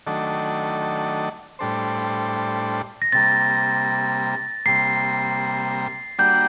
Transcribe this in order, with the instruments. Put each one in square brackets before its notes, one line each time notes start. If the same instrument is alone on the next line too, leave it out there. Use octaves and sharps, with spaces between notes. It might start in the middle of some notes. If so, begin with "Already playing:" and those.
[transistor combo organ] D#3 F#3 A3 D4 A4
A2 G3 D4 A4 C5
[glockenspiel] A#6
[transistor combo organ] C3 G3 A#3 [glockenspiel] A6
[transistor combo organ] C3 G3 A#3 [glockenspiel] C7
[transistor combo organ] G3 A#3 D4 F#4 [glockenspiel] G6